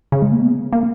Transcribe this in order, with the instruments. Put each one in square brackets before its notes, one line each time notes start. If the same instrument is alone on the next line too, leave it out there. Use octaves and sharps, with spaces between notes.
[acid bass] C#3
G#3
A#3
B3
A#3